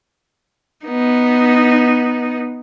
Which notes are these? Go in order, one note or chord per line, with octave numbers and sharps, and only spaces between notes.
B3 D#4